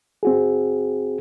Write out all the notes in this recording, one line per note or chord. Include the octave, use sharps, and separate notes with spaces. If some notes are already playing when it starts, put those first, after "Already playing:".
C4 F#4 G#4